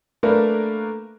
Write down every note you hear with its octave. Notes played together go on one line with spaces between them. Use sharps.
A3 A#3 D4 A#4 B4